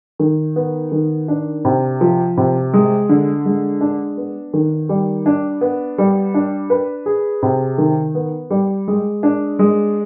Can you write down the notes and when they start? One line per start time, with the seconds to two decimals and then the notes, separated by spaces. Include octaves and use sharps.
0.19 D#3
0.56 B3
0.92 D#3
1.28 D4
1.65 C3
2.01 F3
2.37 C3
2.74 G#3
3.09 D3
3.45 G#3
3.81 D4
4.17 B3
4.54 D#3
4.89 G3
5.26 D4
5.61 B3
5.98 G3
6.34 D4
6.70 B4
7.06 G#4
7.43 C3
7.78 D#3
8.15 B3
8.50 G3
8.88 G#3
9.23 D4
9.59 G#3